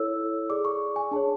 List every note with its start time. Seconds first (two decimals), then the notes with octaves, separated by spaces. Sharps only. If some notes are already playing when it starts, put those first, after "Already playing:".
Already playing: E4 A4 C#5 E6
0.50 G#4 D5 D6
0.65 C#6
0.96 G#5
1.11 D4 G#4 C#5 A5